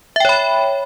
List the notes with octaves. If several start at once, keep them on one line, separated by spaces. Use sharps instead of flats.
C#5 E5 G5 B5